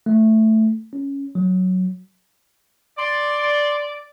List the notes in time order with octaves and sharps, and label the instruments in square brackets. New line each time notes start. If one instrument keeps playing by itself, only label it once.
[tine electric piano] A3
C#4
F#3
[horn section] D5 [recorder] C6